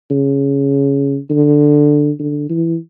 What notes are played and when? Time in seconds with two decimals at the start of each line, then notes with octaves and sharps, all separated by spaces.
0.11 C#3
1.30 D3
2.19 D3
2.49 E3